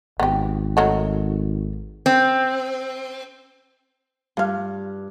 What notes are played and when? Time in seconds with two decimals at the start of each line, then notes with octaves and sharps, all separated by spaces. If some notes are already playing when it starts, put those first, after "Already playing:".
0.20 G#1 B3 G4
0.77 D#3 F#3 A3
2.06 C4
4.37 G2 F4 F5